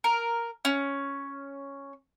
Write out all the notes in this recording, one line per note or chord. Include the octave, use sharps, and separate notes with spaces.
A#4
C#4